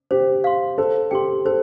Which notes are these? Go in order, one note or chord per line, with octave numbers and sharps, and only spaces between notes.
G4 C5
F5 C6
A4 C5
G4 G5 C6
A4 C5